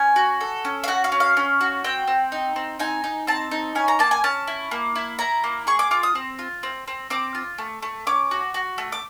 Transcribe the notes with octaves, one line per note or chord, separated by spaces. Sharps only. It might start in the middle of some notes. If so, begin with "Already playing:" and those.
Already playing: C#4 G#5
F#4
A4
C#4
F5
F#4 F#5
F5
C#4
F5
C#4
F#4
C4 G5
C4
D#4
C4
D#4 G#5
D#4
C4 A5
D#4
C#4 G#5
A#5
A#3 A5
G#5
C#4 A5
E4
A#3
E4
E4 A#5
A#3
G#4 C#6
D6
F4 D6
D#6
C4
F4
C4
C4
C4 D6
F4
A3
A3
C#4 D6
F#4
F#4
A3
D6